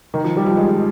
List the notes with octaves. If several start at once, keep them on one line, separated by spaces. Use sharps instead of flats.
D#3
F3
G3
F3
G#3